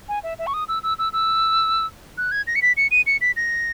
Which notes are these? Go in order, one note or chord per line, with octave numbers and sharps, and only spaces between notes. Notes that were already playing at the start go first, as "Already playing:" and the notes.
G#5
E5
E5
C#6
D#6
E6
E6
E6
E6
F#6
G#6
A#6
C#7
B6
C#7
D#7
C#7
B6
A#6